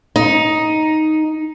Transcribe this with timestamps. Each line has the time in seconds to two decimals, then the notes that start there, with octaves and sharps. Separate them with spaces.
0.16 D#4